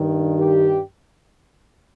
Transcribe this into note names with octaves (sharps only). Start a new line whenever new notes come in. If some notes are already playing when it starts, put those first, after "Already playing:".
Already playing: G2 D#3
G4